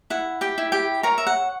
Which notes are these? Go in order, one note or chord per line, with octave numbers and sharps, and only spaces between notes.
E4 F#5
G4 G5
E4
G4 G5
A#4 C#5 A#5
E5
F#5